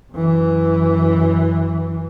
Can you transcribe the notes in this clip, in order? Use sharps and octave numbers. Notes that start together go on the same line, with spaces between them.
F#2 E3